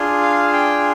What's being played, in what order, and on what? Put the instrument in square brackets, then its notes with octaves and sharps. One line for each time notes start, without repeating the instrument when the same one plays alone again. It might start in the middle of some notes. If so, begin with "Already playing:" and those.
Already playing: [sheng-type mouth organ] D4 F4 G#4
F5
G5